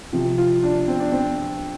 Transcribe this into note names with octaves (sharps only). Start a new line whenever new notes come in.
C3 F3 F4
F4
D4
C4
D4
C4